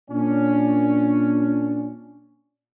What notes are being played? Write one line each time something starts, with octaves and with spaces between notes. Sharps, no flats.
A#2 C#4 D4